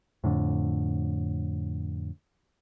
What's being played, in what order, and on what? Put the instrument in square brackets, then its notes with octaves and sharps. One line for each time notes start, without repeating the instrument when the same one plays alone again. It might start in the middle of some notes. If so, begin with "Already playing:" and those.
[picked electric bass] F2 A2 D3